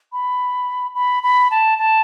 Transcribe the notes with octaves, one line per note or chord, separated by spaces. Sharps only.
B5
B5
B5
A5
A5